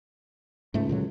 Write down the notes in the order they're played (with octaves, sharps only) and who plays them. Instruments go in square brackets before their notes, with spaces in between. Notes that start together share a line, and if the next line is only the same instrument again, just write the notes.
[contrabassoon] C#2 [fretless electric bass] G#2 A3
[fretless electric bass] A#2 D3 F#3